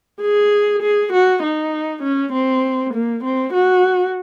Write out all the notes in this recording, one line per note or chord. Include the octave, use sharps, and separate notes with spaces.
G#4
G#4
F#4
D#4
C#4
C4
A#3
C4
F#4